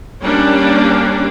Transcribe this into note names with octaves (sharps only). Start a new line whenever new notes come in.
G3 A#3 C#4 D4